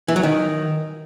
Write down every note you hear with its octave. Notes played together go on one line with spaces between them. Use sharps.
E3
F#3
D#3